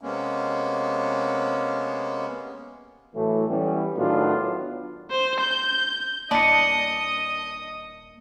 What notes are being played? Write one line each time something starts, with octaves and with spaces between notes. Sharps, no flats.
C3 G#3 A#3 B3 C#4
A2 E3 F#3 A3
E3 G3 B3 C#4
A2 D#3 F#3 B3 D4 F4
C5
G6
D#1 E3 A#3 D4 D#5 D#6 C#7